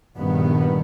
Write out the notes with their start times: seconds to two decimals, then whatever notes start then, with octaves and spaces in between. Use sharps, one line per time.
0.17 A#1 G2 D#3 B3